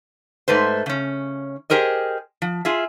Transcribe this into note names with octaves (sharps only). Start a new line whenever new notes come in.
G#2 A3 B4 C5
C#3 C#4
G4 G#4 A#4 C5 D#5
F3
F4 G#4 E5